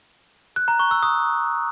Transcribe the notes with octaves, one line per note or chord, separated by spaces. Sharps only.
F#6
A#5
C#6
E6
D#6